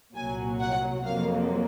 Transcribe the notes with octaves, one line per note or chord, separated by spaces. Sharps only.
C2 A#2 F#3 G#5
F#5
F2 C3 F#3 A#3 F5